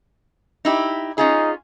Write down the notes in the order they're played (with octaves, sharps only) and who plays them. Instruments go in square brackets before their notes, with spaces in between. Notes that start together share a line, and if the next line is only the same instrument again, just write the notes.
[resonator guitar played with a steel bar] D#4 E4 G4
[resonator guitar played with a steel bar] C#4 F4 G#4 [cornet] D#4